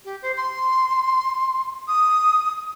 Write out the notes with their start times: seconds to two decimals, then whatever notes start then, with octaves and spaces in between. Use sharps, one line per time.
0.05 G4
0.22 C5
0.37 C6
1.88 D#6